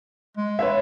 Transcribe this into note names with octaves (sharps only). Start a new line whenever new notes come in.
G#3
B4 C#5 E5